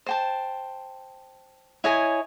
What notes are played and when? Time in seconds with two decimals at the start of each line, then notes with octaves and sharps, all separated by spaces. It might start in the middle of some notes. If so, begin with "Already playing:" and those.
0.06 C5 G5 A5
1.84 E4 C#5 D#5 G#5